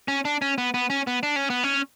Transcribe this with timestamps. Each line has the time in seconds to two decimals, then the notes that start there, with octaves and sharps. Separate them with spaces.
0.08 C#4
0.25 D4
0.42 C#4
0.58 B3
0.74 B3
0.90 C#4
1.07 B3
1.23 D4
1.36 C#4
1.50 B3
1.64 C#4